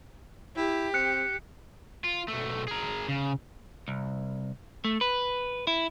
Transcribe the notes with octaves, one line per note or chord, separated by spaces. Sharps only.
E4 G4
C4 F#6 C#7
F4
B1 A3
G#4 A#4
C#3
C2
A3
B4
E4